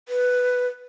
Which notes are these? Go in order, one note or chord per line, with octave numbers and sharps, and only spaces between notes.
B4